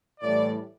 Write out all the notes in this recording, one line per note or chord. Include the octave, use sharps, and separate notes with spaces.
A2 E3 G3 D5